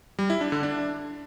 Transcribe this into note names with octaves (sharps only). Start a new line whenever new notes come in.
G3
E4
D4
D3
D4